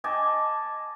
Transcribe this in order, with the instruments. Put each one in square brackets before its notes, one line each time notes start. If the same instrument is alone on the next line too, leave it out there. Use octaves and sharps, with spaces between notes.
[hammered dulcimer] D#5 G#5 A5 D6